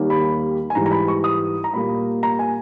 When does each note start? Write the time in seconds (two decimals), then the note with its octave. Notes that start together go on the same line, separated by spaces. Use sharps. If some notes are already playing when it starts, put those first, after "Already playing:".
Already playing: D#2 D#3 G3 A#3
0.10 B5
0.70 G#5
0.75 G#2 E3 G3 A#5
0.86 A#5
0.92 B5
1.08 C#6
1.24 D#6
1.64 A#5
1.74 A#2 G3 A#3 B5
2.23 A#5
2.39 G#5